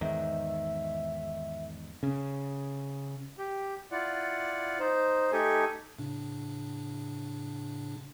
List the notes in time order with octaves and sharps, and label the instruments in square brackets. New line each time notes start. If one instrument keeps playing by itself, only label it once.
[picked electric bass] E2 G#2 D#3 [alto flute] E5
[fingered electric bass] C#3
[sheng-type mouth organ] G4
E4 F4 D5 F#5
D#4 C5
A3 D#4 G4 A4 G#5
[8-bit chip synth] A2 C#3 D4